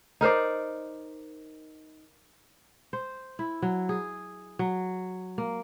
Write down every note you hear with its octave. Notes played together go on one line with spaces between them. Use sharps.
D#4 A#4 C5 D5
C5
E4
F#3
G#4
F#3
A#3